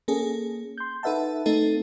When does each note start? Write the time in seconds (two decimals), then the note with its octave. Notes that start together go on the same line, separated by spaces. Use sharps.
0.08 A#3 C#4 G#4 A4
0.78 C6 G6
1.03 D#4 A4 B4 E5 F#5 A5
1.46 A3 C4 D#4 A4